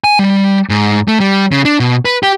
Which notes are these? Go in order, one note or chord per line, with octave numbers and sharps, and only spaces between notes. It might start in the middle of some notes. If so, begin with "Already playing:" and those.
G#5
G3
G#2
A3
G3
C#3
D4
B2
B4
G4